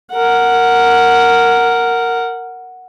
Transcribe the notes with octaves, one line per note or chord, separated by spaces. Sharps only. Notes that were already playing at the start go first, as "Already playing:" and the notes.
A#4 F#5